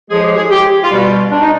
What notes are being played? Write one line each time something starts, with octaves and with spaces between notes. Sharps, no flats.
A2 F3 G#3 G#4
G4
G#4
G4
F4
B2 G3 F#4
D4
D#4